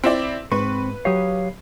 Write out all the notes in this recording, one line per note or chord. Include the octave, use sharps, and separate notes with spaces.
C4 E4 D5
G#2 C4 B4 C#6
F#3 G4 C#5 F5 D#6